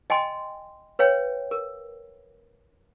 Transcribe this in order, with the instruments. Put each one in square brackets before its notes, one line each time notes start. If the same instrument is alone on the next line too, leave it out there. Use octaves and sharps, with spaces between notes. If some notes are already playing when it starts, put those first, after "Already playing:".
[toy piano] D#5 G5 G#5 C6
B4 C#5 F5 G5
A#4